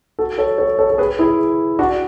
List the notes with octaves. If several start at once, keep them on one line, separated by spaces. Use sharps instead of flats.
F#4 A4
A4 C#5
A4 C#5
A4 C#5
A4
G#4 B4
E4 G#4
D4 F#4